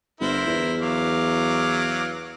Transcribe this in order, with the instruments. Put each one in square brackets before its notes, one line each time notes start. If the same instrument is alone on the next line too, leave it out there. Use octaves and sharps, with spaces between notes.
[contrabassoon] G1 [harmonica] E4 A#4 C5
[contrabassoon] E2
[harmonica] F#3 F5 D6